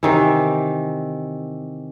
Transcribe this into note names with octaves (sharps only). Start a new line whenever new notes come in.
C3 D#3 E3